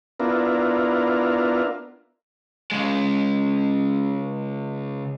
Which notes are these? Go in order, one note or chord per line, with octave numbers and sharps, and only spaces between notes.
B3 D4 E4 F4 A#4
C#3 G#3